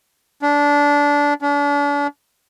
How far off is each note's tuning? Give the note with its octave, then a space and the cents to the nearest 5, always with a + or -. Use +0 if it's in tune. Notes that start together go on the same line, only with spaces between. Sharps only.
D4 -20
D4 -40